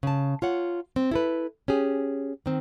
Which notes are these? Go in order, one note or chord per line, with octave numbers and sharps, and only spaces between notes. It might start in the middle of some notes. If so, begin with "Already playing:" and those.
C#3 A5
F4 C#5 F#5
C4
E4 A4 B4
C#4 G4 G#4
D#3 C4